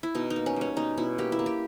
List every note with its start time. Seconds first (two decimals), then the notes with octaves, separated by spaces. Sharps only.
0.03 E4
0.15 B2 D#4
0.30 D#4
0.36 A#3
0.46 C#4
0.56 G3 C#4
0.76 B2 D#4
0.97 B2 E4
1.18 A#3 G4
1.32 E4
1.39 A#3
1.46 G4